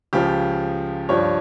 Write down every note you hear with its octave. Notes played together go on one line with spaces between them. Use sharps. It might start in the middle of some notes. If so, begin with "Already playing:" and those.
C#2 C#3 F3 G4
G2 F3 C#5